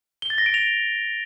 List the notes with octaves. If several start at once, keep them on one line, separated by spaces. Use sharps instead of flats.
G7
A6
A#6
D7
F7